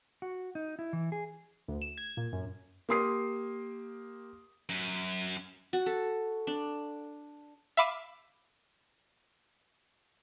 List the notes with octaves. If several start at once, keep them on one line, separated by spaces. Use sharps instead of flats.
F#4
D#4
E4
E3
G#4
D2
E7
G#6
A#2
F#2
A#3 G4 C6 D#6 C7
F#2
F#4
A4
D4
E5 F5 B5 D6 D#7 E7